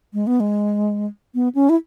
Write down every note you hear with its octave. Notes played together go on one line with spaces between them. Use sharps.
G#3
B3
G#3
B3
C#4
E4